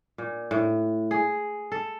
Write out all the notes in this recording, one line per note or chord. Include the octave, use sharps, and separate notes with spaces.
A#2
A2
G#4
A4